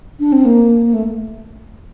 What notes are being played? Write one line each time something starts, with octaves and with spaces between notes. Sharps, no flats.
D4
C4
A#3
A3